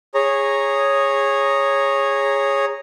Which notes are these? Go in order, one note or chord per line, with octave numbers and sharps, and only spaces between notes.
G#4 C#5 A#5